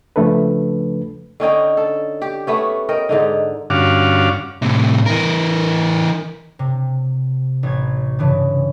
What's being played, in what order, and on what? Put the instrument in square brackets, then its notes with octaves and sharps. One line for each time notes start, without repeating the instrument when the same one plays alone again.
[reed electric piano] C#3 F3 A3 D4 A4 B4
[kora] D3 C#4 D#4 G5
A4
G4
A3 B3 C#4
A#4 D#5 G5
G#2 D3 D#4
[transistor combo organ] G2 D3 C#4 F#4 F5 D6
[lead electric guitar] A2 C3
E3 A#4
[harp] C3
A1 G#6
G2 C#3 E3